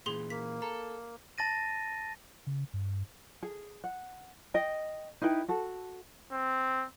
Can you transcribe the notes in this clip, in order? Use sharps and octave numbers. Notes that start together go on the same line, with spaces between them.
A#2 E3 G#4 C6 G7
A#3 B6
A4 A#5
A5 A6 A#6 D#7
C#3
G2
G#4
F#5
D#5 G5
D#4 E4 B4 G5
F#4 A4
C4